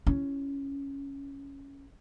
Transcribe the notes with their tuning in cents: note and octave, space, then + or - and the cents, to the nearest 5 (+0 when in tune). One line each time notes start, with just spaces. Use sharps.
C#4 +0 E4 +20